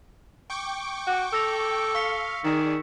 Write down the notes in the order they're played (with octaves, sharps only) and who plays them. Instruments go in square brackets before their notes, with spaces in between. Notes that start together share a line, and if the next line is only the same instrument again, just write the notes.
[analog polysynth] G5 C#6 D6
[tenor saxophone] F#4
[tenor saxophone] A4 [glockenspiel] E6 A#6 F7
[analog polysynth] F5 [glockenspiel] C#6 B6 C#7
[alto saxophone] D#3 [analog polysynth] G#4 D5